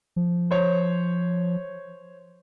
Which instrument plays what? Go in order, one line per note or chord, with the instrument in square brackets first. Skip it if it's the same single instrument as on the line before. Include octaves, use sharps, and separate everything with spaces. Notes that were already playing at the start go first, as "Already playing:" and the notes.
[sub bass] F3
[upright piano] C5 C#5